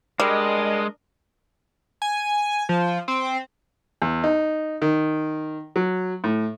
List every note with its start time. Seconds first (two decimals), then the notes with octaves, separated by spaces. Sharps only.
0.20 G3 G#3 D4 A#4 D#5
2.02 G#5
2.69 F3
3.08 C4
4.02 E2
4.24 D#4
4.82 D#3
5.76 F#3
6.24 A2